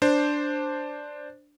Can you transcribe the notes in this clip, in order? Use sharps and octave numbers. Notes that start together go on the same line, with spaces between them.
D4 C5